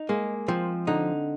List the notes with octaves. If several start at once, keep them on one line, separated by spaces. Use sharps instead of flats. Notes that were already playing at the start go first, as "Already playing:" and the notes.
Already playing: D#4
G#3 A#3
F3 C4
D3 D#4